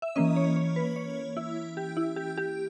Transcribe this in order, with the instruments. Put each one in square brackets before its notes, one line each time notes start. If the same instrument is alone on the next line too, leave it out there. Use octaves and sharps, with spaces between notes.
[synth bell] E5
E3 A#3 C#4 D#5
C#5
C#5
B4
C#5
E4
G4
E4
G4
G4